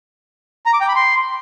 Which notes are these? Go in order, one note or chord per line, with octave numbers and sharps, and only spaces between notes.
A#5
D6
G5
B5
C6